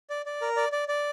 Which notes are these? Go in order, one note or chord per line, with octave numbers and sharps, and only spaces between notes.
D5
D5
A#4
D5
D5
D5